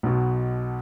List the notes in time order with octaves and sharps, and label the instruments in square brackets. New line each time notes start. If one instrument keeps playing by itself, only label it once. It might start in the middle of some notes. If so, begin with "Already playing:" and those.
[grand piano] B1 B2